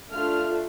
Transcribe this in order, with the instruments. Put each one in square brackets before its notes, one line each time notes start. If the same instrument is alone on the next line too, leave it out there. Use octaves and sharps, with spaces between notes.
[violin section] A3 D4 F4 A4 F6